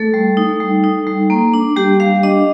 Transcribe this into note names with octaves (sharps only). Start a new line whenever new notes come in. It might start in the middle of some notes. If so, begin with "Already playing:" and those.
Already playing: A3 A4
G3
D#4
G3
D#4
G3
A#3
D4
G3 G4
G3 F5
D4 D#5